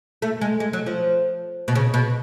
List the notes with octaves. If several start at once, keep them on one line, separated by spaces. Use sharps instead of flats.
A3
G#3
G#3
F#3
F3
B2
C#3
B2